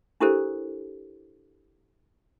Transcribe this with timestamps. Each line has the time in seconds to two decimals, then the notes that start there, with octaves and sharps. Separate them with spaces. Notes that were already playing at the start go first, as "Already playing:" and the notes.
0.20 D4 E4 G4 A4 A#4 C5